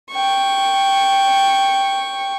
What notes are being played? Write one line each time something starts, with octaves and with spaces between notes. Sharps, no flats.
G5 C#6